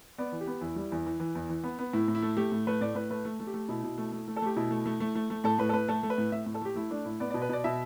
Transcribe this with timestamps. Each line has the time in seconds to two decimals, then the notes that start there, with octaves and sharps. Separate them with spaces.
0.18 B3 D5
0.32 E3
0.40 G4
0.47 B3
0.61 E2 E4
0.76 G3
0.92 E2
1.06 E3
1.20 E3
1.35 E2
1.49 E3
1.64 B3
1.79 B3
1.93 A2 E4
2.08 A2
2.15 E4
2.22 A3
2.37 A3 G4
2.52 A2
2.67 A3 B4
2.81 A2 D5
2.95 A2 B4
3.10 A3 B4
3.25 A3
3.40 A3
3.47 G4
3.54 A3
3.68 B2 E4
3.84 B2
3.98 A3
4.12 A3
4.28 A3
4.36 A4
4.42 A3 G4
4.56 B2 E4
4.71 A3
4.86 A3
5.00 A3
5.15 A3
5.30 A3
5.44 A2 A4
5.58 A2 B4
5.69 A4
5.73 A2 B4
5.88 A3 A4
6.03 A3
6.10 B4
6.18 A2
6.32 A2 E5
6.46 A2
6.54 A4
6.61 A3 G4
6.75 A3 E4
6.91 A3 D4
7.05 A2 E4
7.20 B3 D5
7.30 B2 D5
7.42 B4
7.49 B2 D5
7.64 B2 E5